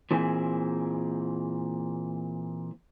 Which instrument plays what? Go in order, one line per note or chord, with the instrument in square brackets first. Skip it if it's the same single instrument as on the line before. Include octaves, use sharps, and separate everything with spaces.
[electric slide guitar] A#2 E3 C4 G#4